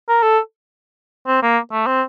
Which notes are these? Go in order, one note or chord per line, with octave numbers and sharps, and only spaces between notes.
A#4
A4
C4
A#3
A3
C4